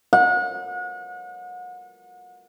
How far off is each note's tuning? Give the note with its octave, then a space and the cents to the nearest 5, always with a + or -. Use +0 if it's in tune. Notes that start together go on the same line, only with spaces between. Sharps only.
F#5 -35